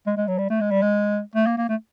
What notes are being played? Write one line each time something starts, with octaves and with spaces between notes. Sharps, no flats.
G#3
G#3
F#3
G3
A3
G#3
G3
G#3
A3
A#3
A#3
A3